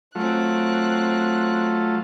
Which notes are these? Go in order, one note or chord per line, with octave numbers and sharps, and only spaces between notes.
F#3 A3 C4 F4 F#6